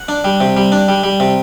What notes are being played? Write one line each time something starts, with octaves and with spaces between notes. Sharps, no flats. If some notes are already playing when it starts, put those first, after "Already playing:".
Already playing: F#5
D4
G3
C3
G3
D4
G3
G3
C3